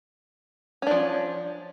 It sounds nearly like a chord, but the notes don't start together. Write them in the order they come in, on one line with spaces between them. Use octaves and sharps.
C#4 D4 F3